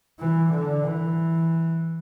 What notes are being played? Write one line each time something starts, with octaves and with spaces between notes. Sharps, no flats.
E3
D3
E3